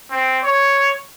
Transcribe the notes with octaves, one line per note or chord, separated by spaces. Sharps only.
C4
C#5